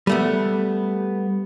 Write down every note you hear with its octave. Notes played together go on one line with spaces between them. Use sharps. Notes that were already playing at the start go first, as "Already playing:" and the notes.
G3 A3 B3